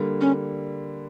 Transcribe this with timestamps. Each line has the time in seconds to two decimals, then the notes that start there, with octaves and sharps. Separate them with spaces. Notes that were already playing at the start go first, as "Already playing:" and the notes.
Already playing: D3 G3 A#3
0.21 C#4